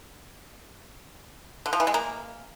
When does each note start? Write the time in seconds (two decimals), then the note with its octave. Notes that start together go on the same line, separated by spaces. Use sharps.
1.66 D3
1.73 F3
1.80 E3
1.87 G#3
1.94 A#3